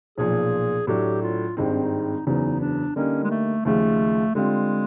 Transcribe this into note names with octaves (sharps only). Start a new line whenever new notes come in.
B1 A#2 F3 G#4
A2 F#3 A3 D4 G4
F4
G#1 G2 D#3 G#3 C4 E4
D#4
D4
D#4
F#1 E2 C#3 F#3 B3 D#4
D4
D3 G3 A#3 C#4 D#4
G#3
A3
D#2 C#3 F3 G#3 A3
D3 G3 G#3 C4 F4